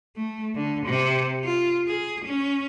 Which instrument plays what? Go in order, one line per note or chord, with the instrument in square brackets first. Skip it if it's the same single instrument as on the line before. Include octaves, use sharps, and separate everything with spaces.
[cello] A3
D3
C3
F4
G#4
C#4